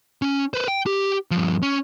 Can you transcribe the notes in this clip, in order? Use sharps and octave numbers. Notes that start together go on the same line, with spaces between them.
C#4
B4 C5
G5
G4
G2 F3
C#4